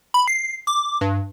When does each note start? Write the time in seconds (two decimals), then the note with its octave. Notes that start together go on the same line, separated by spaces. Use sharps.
0.14 B5
0.28 C7
0.67 D6
1.01 G2